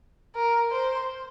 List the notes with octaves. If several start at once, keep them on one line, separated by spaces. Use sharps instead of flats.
A#4
C5